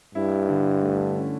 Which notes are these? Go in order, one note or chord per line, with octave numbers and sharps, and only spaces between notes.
G2 E4
D3
A3
C#4